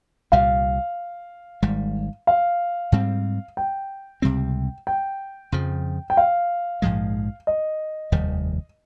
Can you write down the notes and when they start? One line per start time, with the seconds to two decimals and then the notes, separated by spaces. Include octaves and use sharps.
0.32 C2 A#2 G3 F5
1.62 G#1 G#2 G3
2.27 F5
2.92 G#2 G3 C4
3.57 G5
4.22 C#2 C3 G3 C4
4.87 G5
5.52 F2 C#3 F3
6.10 G5
6.17 F5
6.82 A#1 G#2 F3 G#3
7.47 D#5
8.12 F1 D#2 D#3 G3